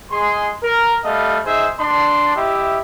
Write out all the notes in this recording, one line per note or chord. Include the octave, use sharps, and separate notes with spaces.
G#3 G#4 C6
A#4
G3 A3 D#5 F5
D#4 G#4 C5 E5
D4 C6
E4 G4 D#5 E5